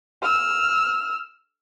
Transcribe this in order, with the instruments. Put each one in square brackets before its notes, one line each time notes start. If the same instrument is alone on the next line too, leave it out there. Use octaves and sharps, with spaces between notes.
[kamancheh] E6 F6